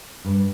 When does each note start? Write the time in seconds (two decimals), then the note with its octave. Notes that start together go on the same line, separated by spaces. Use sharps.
0.25 G2